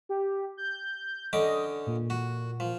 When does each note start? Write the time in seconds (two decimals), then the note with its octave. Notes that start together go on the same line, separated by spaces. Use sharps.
0.09 G4
0.57 G6
1.33 D3 C#4 D#5 D6
1.87 A#2
2.10 F#4
2.60 F3